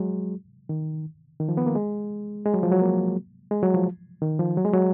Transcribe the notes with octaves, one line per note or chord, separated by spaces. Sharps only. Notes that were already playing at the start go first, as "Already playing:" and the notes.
Already playing: F#3 G#3
D#3
D#3
F3
B3
A#3
G#3
G#3
F#3
F3
F#3
A#3
G#3
F#3
F3
D#3
F3
F#3
G#3
F#3